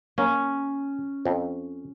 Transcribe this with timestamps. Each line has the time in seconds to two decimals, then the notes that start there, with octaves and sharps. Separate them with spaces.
0.18 A#3 C#4
1.25 F2